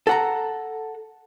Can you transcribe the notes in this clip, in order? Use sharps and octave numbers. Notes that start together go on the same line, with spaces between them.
A4 F#5 A#5